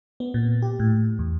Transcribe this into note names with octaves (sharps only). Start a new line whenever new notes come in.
B3
A#2
G4
A2
E2